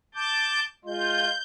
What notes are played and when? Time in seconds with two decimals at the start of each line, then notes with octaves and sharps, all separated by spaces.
0.15 A5 D6 G6
0.85 G#3 F4 G6